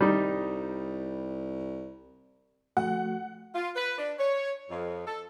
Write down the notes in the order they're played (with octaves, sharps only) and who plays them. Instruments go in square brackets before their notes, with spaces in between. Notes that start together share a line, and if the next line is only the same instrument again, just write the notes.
[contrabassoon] C2 [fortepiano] G3 D#4
[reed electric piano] F3 A3 F#4 [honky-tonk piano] F#5
[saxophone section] F4
B4
D4
C#5
F2
A4